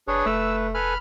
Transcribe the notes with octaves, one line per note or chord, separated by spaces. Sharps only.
F#1 D4 G#4 B4 C#5
F1 A3 E6
A4 B4 G#5 B5 F6